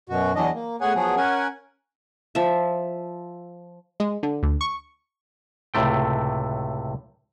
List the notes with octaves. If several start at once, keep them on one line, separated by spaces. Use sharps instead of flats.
F#2 B2 F#4
E2 E3 F#3 D4 D#5
A#3
A2 B3 G#4 C#5 F#5 G#5
F3 F#3 B3 G#4
C#4 A#4 F#5 G#5
F3 E5
G#3
D3
D2
C#6
C#2 A2 C3 A3 G5